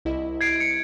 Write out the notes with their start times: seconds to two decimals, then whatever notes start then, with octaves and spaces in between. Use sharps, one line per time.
0.05 C2 E4 D#5
0.41 G#6 C7 D7
0.61 C#7